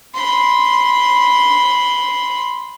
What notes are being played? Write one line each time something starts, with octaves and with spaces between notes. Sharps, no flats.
B5 C6